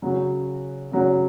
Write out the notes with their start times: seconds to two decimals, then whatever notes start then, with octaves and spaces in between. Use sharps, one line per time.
0.02 C#3 F#3 C#4 F#4
0.92 C#3 F#3 C#4 F#4